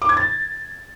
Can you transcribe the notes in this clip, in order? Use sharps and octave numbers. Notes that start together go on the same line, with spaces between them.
D6
G#6
A6